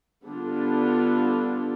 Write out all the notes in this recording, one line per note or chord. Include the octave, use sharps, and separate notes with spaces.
D3 G3 B3 D4 F4